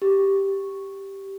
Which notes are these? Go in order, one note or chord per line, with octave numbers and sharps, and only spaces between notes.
G4